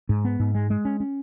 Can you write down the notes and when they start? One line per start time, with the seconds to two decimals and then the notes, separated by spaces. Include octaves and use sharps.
0.09 G#2
0.25 B3
0.40 G#2
0.55 G#3
0.70 G#3
0.85 C#4
1.00 C#4